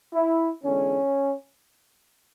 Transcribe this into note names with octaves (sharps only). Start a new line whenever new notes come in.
E4
E2 D3 G#3 C#4